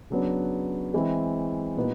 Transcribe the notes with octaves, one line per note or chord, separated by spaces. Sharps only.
C#3 F#3 B3 D4
E3 G#3 C4 E4
A#2 G3 B3 D#4